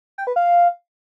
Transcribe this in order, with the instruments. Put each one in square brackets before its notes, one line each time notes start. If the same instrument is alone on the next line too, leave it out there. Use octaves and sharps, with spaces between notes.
[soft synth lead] G5
B4
F5